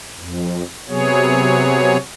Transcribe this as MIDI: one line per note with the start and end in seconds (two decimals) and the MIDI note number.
0.17 0.63 41
0.88 1.97 48
0.88 1.97 54
0.88 1.97 59
0.88 1.97 68
0.88 1.97 73